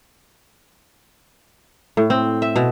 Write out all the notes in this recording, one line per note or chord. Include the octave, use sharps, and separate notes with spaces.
A2
C4
E5
B2